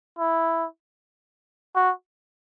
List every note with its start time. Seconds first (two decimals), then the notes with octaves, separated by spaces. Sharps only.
0.19 E4
1.76 F#4